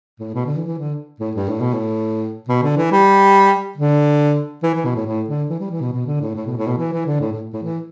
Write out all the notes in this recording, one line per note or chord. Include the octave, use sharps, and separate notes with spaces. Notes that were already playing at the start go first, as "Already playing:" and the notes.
A2
B2
D3
E3
E3
D3
A2
G2
A2
B2
A2
B2
D3
E3
G3
D3
E3
E3
B2
A2
A2
D3
E3
G3
E3
B2
B2
D3
A2
A2
B2
A2
B2
E3
E3
D3
A2
A2
A2
E3